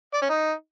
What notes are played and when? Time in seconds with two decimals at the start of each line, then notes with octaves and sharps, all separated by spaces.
0.14 D5
0.22 C#4
0.30 D#4